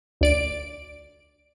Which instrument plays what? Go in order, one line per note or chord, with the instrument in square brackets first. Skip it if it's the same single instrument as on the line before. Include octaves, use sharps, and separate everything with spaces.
[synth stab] D2 D5 D7